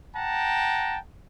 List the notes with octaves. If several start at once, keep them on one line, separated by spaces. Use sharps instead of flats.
F#5 G5 A5 A#5